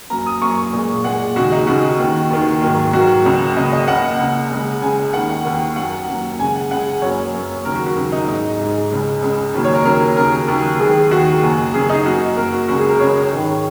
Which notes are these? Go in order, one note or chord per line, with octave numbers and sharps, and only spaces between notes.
F#2 F#3 A#3 A#5
D#6
F#2 F#3 A#3 C#6
A#2 G#3
A#2 G#3 F#5
D#2 C#3 G#3 F#4
D#4
D#2 C#3 G#3 F#4
D#2 D#3 A#3
D#2 D#3 A#3
G#2 D#3 F#3 A#3
G#2 D#3 F#3 A#3 F#4
C#2 C#3 A#3
C#2 C#3 A#3 D#5
D#5
C#2 C#3 A#3 F#5
C#2 C#3 A#3
C#2 C#3 G#3
C#2 C#3 G#3 G#5
D#2 D#3 A#3 F#5
D#2 D#3 A#3
F#2 F#3 A#3 F#5
F#2 F#3 A#3
C#2 C#3 G#3 G#5
F#5
C#2 C#3 G#3 F#5
F#2 F#3 A#3 C#5
F#2 F#3 A#3
D#2 C#3 F#3 A#4
F#4
F#4
D#2 C#3 F#3
D#4
G#2 G#3 D#4
G#2 G#3
C#2 C#3 G#3
C#2 C#3 G#3
D#2 C#3 F#3 A#3
C#5
A#4
D#2 C#3 F#3 A#3 A#4
D#2 C#3 F#3 A#4
D#2 C#3 F#3
D#2 D#3 G#3 G#4
D#2 D#3 G#3 F#4
F#2 C#3 F#3 A#3
F#2 C#3 F#3 A#3 G#4
D#4
F#2 F#3 A#3 F#4
F#2 F#3 A#3 A#4
F#4
C#2 C#3 G#3 F#4
G#4
A#4
C#2 C#3 G#3 C#5
G#2 D#3 G#3